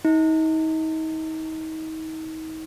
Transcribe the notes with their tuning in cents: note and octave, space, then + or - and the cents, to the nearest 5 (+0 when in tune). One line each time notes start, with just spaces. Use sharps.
D#4 +35